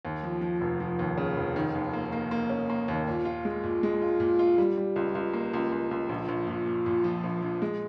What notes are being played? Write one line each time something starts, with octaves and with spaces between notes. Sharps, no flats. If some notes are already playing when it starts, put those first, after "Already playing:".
D#2
F3
F3
F1
F3
D#2
C#3
F1
D#3
D#2
A#3
A#3
A#3
C#4
A#3
D#2
A#2
F4
G#3
A#2
G#3
F4
A#2
F4
G3
G3
C#2
C#2
A#3
C#2
C#2
C#2
A#1
A#1
A#2
A#2
A#2
F3
A#1
A#1
G#3